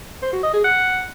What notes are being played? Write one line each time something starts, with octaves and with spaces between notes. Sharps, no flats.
C5
F#4
D#5
G#4
F#5